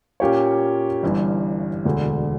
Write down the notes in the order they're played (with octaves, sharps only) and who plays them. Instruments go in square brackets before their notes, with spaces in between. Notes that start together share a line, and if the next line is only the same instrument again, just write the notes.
[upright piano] A#2 A#3 C#4 G4 C#5
G1 G2 E3
E1 D2 D3